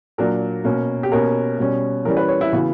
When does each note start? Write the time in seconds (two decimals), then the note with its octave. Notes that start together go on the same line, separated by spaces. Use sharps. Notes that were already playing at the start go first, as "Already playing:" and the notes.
0.18 A#2 F#3 A#3 D4 A#4
0.65 B2 A#3 C#4
1.03 G4
1.12 B2 A#3 C#4 A#4
1.58 B2 G3 C#4
2.05 E3 G3 C#4 A#4
2.17 B4
2.28 C#5
2.41 E4
2.53 C#3 E3 B3 F#4